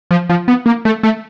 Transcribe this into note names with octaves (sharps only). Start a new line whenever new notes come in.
F3
F3
B3
A#3
A3
A3